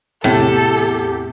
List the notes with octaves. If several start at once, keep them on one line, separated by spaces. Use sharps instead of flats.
E2 A2 C3 G4 A4